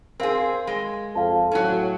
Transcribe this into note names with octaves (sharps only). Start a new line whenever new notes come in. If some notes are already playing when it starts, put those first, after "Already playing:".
C4 G#4 A#4 F5 C6
G#3
F2 A4 F5 A5
A2 F#3 C#4